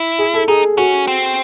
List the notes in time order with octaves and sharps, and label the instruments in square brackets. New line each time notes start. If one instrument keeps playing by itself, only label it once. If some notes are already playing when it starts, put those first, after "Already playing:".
Already playing: [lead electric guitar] E4
[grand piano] G#4
A4
[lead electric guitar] D#4 [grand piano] G#4
[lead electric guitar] C#4 [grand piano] F#4
[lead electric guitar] C4